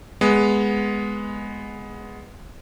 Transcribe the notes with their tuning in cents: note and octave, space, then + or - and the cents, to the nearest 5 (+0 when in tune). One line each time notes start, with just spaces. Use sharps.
G#3 +0 B3 +0